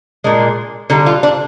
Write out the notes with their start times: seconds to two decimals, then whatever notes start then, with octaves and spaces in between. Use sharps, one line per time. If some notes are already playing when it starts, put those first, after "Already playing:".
0.24 A#2 G#3 D4
0.90 D3 G3 D#4
1.06 F4
1.23 D4